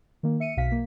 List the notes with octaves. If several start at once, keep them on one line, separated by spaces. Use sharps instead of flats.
D#3 A#3
E5 C#7 D#7
B1 B2 F5 B6
A#3